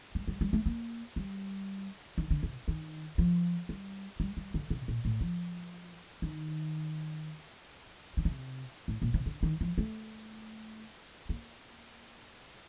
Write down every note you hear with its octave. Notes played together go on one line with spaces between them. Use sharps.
G3
G3
G3
A3
A#3
G3
D#3
D3
C3
D#3
F3
G3
G3
G3
D3
C3
A#2
A2
F3
D#3
D3
C3
A2
A#2
C3
D3
D#3
F3
A3
A#3